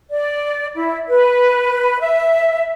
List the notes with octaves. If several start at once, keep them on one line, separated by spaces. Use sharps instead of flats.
D5
E4
B4
E5